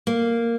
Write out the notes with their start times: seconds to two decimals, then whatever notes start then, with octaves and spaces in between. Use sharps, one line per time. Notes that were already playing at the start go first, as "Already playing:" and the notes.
0.07 A#3